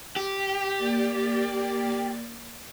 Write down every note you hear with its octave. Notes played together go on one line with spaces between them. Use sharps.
G4
A#3 D5 A6